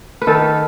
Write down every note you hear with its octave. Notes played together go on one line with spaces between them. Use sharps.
B4
D#3 A4